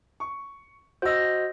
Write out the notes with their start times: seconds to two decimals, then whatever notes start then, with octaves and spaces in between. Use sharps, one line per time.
0.20 C#6
1.02 F#4 C5 D#5 E6